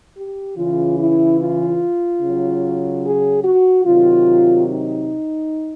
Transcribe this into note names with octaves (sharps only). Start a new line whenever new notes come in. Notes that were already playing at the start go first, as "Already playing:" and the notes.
G4
C#3 E3 F4
E4
F4
C#3 F#3
G#4
F#4
C3 D#3 F#3 F4
D#4